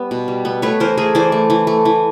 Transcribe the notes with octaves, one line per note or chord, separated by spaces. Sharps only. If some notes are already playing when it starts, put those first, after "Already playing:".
Already playing: G3 B3
B2
G3
B3
A3 B4 C#5
E3 A#4 C5
A3 G#4 A#4
E3 C5 D5
A3
E3
A3
E3